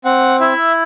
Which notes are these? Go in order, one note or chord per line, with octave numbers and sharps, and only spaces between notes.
C4 F#5
E4 E5